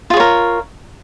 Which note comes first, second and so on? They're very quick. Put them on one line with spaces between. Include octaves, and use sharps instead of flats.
F4 G#4 C#5 A#4